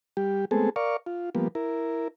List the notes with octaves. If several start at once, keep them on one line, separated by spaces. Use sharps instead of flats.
G3 G4
G#3 A3 B3 C4 G#4 A4
A#4 D5 F5 C#6
F4
F3 G3 A#3 B3
E4 A#4